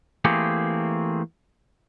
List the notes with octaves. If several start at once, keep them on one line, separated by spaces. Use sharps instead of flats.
E3 A3 A#3 C4 G4 G#4